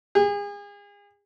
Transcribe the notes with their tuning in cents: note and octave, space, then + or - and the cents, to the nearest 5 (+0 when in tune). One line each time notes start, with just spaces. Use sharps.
G#4 -35